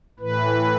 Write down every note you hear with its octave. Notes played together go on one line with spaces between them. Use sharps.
A2 E3 B4